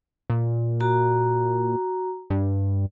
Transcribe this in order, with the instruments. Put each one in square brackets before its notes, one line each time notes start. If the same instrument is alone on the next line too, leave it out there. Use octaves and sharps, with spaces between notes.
[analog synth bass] A#2
[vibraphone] F#4 A#5
[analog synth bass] G2